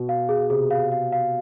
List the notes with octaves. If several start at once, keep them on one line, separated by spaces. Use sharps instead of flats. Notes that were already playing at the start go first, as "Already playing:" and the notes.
Already playing: B2
F5
G#4
C3 G#4
F5
F5
F5